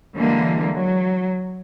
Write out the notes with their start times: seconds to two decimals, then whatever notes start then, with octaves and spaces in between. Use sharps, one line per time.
0.15 D3 E3 G3 G#3 A#3
0.74 F#3